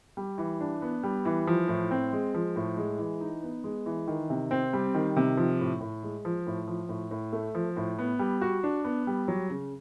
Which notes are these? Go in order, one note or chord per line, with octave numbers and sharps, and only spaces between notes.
G3
E3
D4
B3
G3
E3
F3
A2
C4
G#3
F3
A2
G#3
E3
D#4
B3
G#3
E3
D#3
C3
C4
G3
D#3
C3
F3
A2
A2
G#3
F3
A2
F3
A2
A2
A3
F3
A2
B3
G3
F#4
D4
B3
G3
F#3
C#3